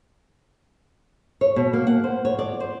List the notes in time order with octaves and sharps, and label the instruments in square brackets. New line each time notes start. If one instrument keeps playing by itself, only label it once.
[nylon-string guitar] C#5
B2
A#3
F#5
C5
C#5
D5
C5